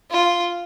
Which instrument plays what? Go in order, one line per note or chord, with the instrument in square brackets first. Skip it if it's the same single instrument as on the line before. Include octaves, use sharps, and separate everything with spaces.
[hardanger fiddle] F4